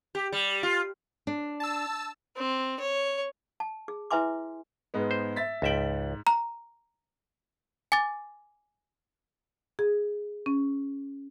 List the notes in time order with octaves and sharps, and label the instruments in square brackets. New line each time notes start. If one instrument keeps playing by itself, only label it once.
[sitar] G4
G3
F4
[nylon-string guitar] D4
[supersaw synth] A5 E6
[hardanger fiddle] C4
C#5
[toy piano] A5
G#4
E4 B4 E5 G#5 C6 D6
[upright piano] G#2 G#3 B3
[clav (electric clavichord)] C5
[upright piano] E5 A6 B6
[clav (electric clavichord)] C#2 E5 G5 [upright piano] G#2 F#7
[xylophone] A#5
G#5 D6 A6
[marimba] G#4
C#4